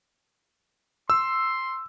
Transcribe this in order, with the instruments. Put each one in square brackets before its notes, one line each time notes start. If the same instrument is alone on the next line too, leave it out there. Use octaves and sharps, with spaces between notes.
[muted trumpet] C6 [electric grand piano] E6